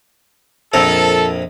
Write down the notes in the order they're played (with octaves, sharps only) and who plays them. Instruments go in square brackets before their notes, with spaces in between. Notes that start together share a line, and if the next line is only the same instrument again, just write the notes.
[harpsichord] A#1 F2 A#4 [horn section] A4